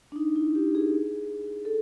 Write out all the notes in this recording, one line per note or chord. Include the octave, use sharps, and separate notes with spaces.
D4
D#4
E4
G4
G#4
A4